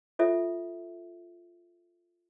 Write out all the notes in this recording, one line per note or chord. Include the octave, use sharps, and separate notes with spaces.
F4 A4 E5